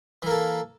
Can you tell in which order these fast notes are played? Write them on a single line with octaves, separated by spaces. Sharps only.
E3 A#3 A4